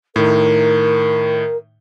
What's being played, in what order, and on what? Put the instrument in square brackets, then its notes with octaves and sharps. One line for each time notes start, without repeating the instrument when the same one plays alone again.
[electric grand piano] A2 D#3 [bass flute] A#4